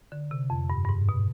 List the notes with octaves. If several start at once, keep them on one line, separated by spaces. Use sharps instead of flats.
D3
C3
F2
G2
G2
G#2
B2